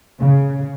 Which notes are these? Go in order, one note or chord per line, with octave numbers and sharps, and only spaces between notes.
C#3